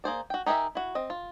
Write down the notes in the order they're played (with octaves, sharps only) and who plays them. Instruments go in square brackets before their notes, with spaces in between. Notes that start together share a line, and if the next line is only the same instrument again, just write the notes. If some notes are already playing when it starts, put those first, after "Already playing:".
[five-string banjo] A#3 G#4 C5 D5
F#4 G5
D#4 G4 G#4 A#4 E5
E4 F#4
C4 D#5
F4